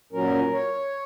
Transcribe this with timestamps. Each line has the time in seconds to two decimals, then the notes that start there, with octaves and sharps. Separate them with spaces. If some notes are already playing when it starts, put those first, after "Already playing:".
0.13 A#2 F#3 C#4 A#4
0.52 C#5